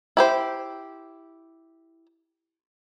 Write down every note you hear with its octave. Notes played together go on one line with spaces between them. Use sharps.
E4 G4 C5